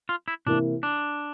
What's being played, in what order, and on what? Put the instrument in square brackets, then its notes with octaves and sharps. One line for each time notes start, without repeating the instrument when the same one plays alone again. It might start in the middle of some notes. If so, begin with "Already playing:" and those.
[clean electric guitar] F4
E4
[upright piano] C3 E3 A#3 E4 [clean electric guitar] D4
[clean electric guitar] D4